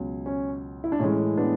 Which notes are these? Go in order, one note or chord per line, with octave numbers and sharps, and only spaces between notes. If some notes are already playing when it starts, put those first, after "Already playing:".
Already playing: C#2 B2 F#3
C#4
E4
D4
A2 E3 G#3 C#4
B3 D4